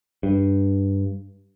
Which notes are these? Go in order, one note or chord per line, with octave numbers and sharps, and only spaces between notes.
G2